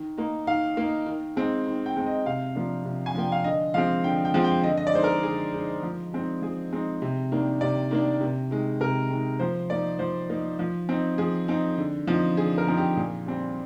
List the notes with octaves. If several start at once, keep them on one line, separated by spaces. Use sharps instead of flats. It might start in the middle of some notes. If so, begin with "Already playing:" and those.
Already playing: D#3
A#3 D#4
D#3 F5
A#3 D#4
D#3
G#3 C4 D#4
D#3
G5
G#3 C4 D#4
D#5
C3 F5
F3 A#3 D4
C3
G#5
F3 A#3 D4 G5
F5
D3 D#5
F3 G#3 C4 F5
D3 G5
G5
F3 G#3 C4
G5
D3 D#5
D#5
D5
G#3 D#4 C5
A#4
D3 G#4
G#3 D#4
F3
G#3 C4 D#4
F3 G#4
G#3 C4 D#4
C3
D#3 A#3 D4
C3 D5
D#3 A#3 D4
C3
D#3 G#3
C3 A#4
D#3 G#3
F3 C5
A#3 D#4 D5
F3 C5
A#3 D#4
F3
C4 D#4
F3 G#4
C4 D#4
D3
F3 C4 D#4
D3 G#4
A#4
F3 C4 D#4
G4
A#2
G3 C4